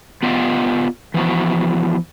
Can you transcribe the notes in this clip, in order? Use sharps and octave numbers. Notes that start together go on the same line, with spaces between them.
B3 F4 G4 D5 D#5 F5
E3 F3 B3 F#4